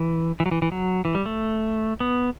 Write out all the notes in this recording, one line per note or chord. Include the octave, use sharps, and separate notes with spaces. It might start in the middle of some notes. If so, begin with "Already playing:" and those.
Already playing: E3
E3
F#3
E3
E3
F#3
E3
G3
A3
B3